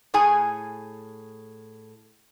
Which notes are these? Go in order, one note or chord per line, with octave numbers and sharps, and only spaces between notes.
A2 G#4 G#5